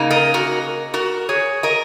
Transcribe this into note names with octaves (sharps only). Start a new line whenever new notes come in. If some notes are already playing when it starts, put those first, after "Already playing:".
Already playing: C#3 A#3 D#4
A#4 D#5
F#4 A#4
F#4 A#4
G#4 C#5
A#4 D#5